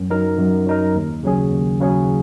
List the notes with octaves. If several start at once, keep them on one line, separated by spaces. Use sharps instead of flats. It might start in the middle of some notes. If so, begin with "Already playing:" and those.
Already playing: F#2
F#3 D#4 A#4
F#2
F#3 D#4 A#4
D#2
C#3 F#3 C#4 G#4
D#2
C#3 F#3 C#4 G#4